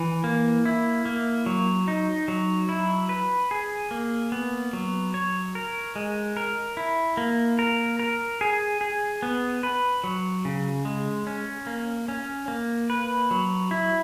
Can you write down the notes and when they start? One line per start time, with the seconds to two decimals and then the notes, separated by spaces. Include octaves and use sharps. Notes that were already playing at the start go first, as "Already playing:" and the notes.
Already playing: E3
0.24 A#3
0.66 E4
1.05 A#3
1.46 F#3
1.88 D#4
2.28 F#3
2.69 E4
3.09 B4
3.51 G#4
3.91 A#3
4.32 B3
4.73 F#3
5.14 C#5
5.55 A#4
5.96 G#3
6.37 A#4
6.77 E4
7.17 A#3
7.59 A#4
7.99 A#4
8.41 G#4
8.81 G#4
9.22 B3
9.63 B4
10.04 F#3
10.45 C#3
10.85 G#3
11.27 C#4
11.67 A#3
12.08 C#4
12.48 A#3
12.90 B4
13.31 F#3
13.71 E4